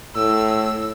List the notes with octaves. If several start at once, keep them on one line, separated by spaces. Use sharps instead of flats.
A2 E6